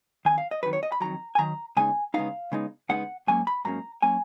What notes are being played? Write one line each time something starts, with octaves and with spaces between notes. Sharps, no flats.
F2 D#3 G#5
F5
D#5
F2 D#3 F#3 B4
C#5
D#5
B5
F2 D#3 F#3 A#5
G#5
F2 D#3 F#3 A#5
C#3 G#3 B3 D#4 G#5
C#3 G#3 B3 D#4 F5
C#3 G#3 B3 D#4
C#3 G#3 B3 D#4 F#5
G#2 F#3 A#3 C#4 G#5
B5
G#2 F#3 A#3 C#4 A#5
F#3 A#3 C#4 G#5